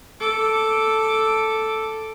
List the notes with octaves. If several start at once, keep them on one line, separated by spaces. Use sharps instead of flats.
A4 D6